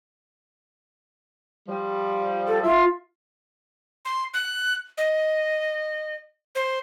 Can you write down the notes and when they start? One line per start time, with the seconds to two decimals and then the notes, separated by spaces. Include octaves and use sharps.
1.69 F3 G3
2.48 A4
2.64 F4 E5
4.05 C6
4.34 F#6
4.98 D#5
6.55 C5